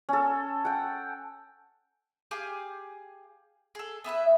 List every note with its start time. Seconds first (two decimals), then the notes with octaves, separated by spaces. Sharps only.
0.09 C#4 A4
0.65 F#5 G5
2.31 G4 G#4 F5 G#5
3.75 G#4 A4
4.04 B3 E4 B4 E5